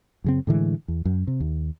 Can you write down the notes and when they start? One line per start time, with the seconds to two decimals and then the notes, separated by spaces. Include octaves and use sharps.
0.24 F#2 C#3 C4
0.47 A2 D3 E3 G#3
0.88 E2
1.05 F#2
1.27 C3
1.40 D#2